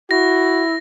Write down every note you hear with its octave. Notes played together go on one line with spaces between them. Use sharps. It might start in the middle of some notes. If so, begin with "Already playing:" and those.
E4 F#4 A#6